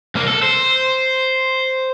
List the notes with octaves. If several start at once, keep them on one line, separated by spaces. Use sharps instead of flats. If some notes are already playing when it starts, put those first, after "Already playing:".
C2 A#3
A4
C5